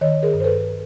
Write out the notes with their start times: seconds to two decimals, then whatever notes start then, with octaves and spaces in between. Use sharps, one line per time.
0.01 D#3 C#5 D#5
0.23 G#4 A#4
0.33 G2
0.40 C5
0.44 A4 B4